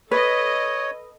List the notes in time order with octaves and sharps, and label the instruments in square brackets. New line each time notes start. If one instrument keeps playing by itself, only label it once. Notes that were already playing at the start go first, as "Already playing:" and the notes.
[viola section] A4 D#5 [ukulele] B4 [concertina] C#5